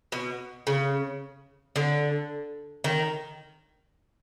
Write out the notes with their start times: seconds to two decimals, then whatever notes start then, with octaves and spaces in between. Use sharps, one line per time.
0.12 B2
0.67 C#3
1.76 D3
2.84 D#3